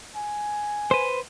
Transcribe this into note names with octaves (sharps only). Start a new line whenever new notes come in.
G#5
B4 C5